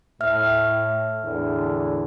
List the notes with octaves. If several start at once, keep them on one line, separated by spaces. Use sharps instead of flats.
A2 E5 F6
E2 A2 D3